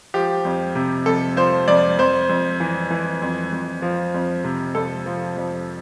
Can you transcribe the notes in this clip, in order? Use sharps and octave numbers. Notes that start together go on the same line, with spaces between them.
F3 G4
F2
C3
F2 A4
F3 C5
F2 D5
F2 C5
F2
E3
E3
F2
F2
F3
F2
C3
F2 A4
F3
F2